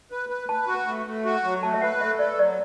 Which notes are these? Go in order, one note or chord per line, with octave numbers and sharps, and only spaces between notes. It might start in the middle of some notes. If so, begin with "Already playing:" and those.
B4
B4
B4 A5
F#4
A3
A3
F#4
F#3
A3 A5
E5
B4 F#5
A3 E5
A4 D5
F#3 D5